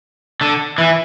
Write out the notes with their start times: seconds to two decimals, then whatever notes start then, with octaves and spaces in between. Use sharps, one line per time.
0.41 D3
0.78 E3